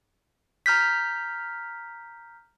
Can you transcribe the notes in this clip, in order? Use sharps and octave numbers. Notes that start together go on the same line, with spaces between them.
A#5 F6 G6 B6